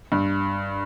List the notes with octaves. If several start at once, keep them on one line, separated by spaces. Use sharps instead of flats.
G2